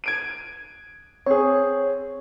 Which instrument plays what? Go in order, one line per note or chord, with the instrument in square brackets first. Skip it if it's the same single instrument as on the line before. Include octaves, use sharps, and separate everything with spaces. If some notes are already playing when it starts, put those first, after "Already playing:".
[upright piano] G#6 D7 D#7
[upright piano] C4 G#4 [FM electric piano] C#5